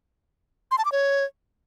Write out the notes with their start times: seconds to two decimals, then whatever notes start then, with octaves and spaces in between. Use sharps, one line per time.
0.71 C6
0.78 A5
0.85 D6
0.92 C#5